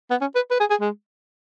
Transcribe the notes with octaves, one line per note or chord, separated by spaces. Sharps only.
B3
C#4
B4
B4
G#4
G#4
G#3